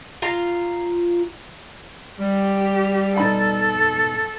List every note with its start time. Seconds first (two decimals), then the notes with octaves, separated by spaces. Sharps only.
0.22 F4 A#5
2.20 G3 G4
3.18 B2 D#4 A4 B5